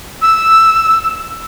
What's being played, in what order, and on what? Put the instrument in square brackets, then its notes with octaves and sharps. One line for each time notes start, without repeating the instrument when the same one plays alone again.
[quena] E6